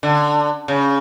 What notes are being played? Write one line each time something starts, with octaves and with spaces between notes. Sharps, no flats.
D3
C#3